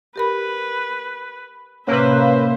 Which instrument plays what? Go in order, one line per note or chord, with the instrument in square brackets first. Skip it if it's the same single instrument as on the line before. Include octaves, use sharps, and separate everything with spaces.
[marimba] G4 A#4 B5 [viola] B4
[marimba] A2 C3 [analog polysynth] A#3 B4 [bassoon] C#4 [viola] C5 E5